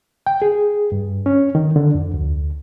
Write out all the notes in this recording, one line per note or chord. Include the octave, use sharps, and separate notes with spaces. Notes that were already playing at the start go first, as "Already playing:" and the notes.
G5
G#4
G2
C#4
D#3
D3
F2
D2